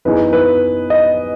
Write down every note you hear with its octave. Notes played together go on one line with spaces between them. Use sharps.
F#2 E3 B3 D#4 G#4 B4
B4
D#5